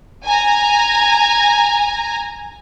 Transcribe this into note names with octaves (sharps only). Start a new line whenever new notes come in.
G#5 A#5